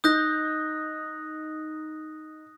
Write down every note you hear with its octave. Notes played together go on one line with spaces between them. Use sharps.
D#4 D#6 F#6 G6 A#6